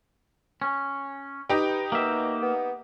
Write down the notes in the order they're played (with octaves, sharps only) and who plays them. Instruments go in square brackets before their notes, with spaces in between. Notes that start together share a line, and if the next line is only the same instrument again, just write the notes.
[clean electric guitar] C#4
[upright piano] D#4 G4 G5 [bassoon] B4
[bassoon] B2 [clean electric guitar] A#3 E5
[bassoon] B3